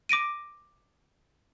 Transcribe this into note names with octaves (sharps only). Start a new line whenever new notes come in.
D6 A#6 D7 D#7